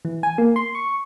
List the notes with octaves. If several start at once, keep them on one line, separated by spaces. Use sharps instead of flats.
E3
G#5
A#3
C6
C#6